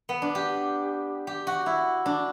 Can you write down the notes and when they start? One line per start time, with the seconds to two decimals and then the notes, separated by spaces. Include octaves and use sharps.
0.09 B3
0.22 D4
0.35 G4
1.27 G4
1.47 F#4
1.66 E4
2.06 D4